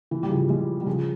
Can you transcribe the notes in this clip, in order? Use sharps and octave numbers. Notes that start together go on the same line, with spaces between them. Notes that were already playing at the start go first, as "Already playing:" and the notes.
E3
G3
C#3 F3
F3 G#3
G3
C#3 F3